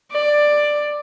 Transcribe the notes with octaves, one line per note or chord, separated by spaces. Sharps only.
D5